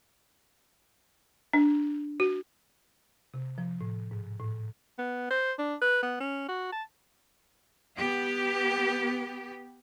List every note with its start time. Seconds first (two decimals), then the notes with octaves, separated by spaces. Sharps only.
1.53 D4
2.20 F#4
3.34 C3
3.58 F3
3.81 A2
4.11 G#2
4.40 A2
4.99 B3
5.30 C5
5.59 D4
5.81 B4
6.03 B3
6.20 C#4
6.49 F#4
6.72 A5
7.99 B3 G4